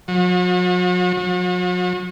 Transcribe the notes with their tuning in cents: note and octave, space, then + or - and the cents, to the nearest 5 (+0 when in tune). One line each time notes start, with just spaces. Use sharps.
F#3 -45
F#3 -45